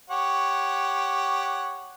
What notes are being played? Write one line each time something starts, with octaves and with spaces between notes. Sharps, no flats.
G4 C#5 F#5